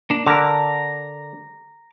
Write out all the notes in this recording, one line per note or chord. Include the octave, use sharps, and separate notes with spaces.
A#3 D4
D3 A#4 A#5 D6